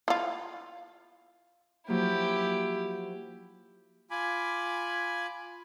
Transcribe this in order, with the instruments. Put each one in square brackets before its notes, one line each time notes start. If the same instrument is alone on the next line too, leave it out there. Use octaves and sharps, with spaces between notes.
[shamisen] E4 F4
[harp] F3 F#3 A#3 [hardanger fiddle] E4 G4
[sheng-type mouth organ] F4 G#5 B5 D6